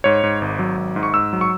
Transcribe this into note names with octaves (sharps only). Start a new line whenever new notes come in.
G#2 C#5
G#2
G#1
F#3
G#1
G#2
C#6
G#2 E6
F#3
C#6